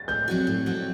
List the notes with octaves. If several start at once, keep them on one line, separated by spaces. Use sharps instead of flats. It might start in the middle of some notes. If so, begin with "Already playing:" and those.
Already playing: A6
A2 G6
F#3 C4 F#4
A2
F#3 C4 F#4